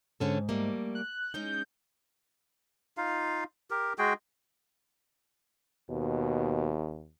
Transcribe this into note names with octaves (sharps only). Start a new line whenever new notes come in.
G#2 D3 C#4 A4
G3 A3 A#3
F#6
G#3 C#4 D#4 G6
D#4 F4 F5
G4 A#4
G#3 F#4 G#4 G5
D#2 B2